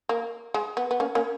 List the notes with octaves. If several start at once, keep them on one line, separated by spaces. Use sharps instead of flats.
A#3
G#3
B3
B3
A#3 C#4
A#3 C#4